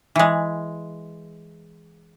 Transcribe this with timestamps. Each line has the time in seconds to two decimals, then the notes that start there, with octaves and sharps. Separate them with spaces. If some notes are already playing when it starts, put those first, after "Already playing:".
0.16 E3 G#3